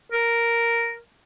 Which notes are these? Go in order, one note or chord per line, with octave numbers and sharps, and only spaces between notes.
A#4